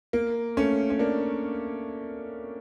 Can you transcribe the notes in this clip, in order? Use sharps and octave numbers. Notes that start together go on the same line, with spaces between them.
A#3
A3 C#4
C#4
A#3 D4